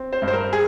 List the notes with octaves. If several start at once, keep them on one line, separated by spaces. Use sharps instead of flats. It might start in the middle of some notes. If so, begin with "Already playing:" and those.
Already playing: C4
C5
G2
C5
A#4
G#4